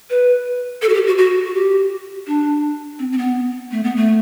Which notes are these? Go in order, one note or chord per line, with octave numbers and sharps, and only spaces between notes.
B4
A4
F#4
G4
F#4
F#4
F#4
G4
D4
C4
C4
B3
A3
B3
A3